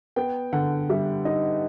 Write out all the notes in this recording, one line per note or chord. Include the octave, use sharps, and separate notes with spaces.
B3 G5
D3 F#5
G3 E5
D#4 D#5